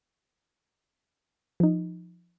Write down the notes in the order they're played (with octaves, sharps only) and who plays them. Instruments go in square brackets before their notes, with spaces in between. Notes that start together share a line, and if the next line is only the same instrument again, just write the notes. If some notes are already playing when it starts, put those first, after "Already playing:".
[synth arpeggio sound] F3 D#4